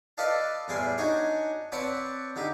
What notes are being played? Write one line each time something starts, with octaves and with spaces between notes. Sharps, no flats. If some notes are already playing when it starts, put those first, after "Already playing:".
A4 B4 D5 D#5 F5 A5
E2 A2 G3 G#4 D5 C6
D4 D#4 F#4 C#5 G#5
C4 B4 C#5 D5 F#5 A5
D3 D#4 G4